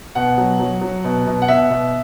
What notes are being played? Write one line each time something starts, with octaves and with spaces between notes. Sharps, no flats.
B2 F#5
F#3
F#3
F#3
B2
B2
F#5
B2 E5
B2